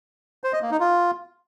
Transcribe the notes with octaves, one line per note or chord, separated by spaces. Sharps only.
C5
D#5
A#3
D#4
F4